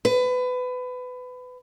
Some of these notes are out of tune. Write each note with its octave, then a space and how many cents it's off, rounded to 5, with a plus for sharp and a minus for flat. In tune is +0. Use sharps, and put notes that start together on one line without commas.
B4 +25